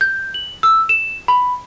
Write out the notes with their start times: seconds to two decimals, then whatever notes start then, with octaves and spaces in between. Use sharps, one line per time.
0.01 G6
0.34 F#7
0.63 E6
0.89 E7
1.28 B5